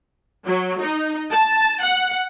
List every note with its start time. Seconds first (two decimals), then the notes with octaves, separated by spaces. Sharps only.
0.45 F#3
0.80 D#4
1.30 A5
1.82 F#5